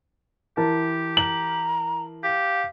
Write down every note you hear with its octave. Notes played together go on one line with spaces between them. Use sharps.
E3 G4 A#4 A5
A#5 F#7
G4 F5